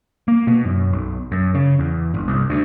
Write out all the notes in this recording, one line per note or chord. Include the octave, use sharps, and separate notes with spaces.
A#3
B2
F#2
B1
F#2
C#3
E2
G1
C2
D2